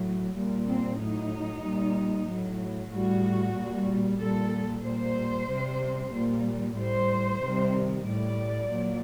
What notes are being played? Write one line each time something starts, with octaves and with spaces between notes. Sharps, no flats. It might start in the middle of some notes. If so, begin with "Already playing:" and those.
Already playing: A2 F#3
A#2 G3
C4
A2 F#3 D#4
A#2 G3
A2 F#3
A2 G3 F#4
A#2 G3
A#2 G3 A4
A#2 G3 C5
C3 G3
A#2 G3
A2 G3 C5
C3 D#3 G3
A2 G3 D5
A#2 F#3